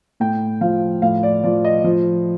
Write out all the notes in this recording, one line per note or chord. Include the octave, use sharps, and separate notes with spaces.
A2 G5
F3 F5
A2 F5
D5
F3 D5
D#5
F3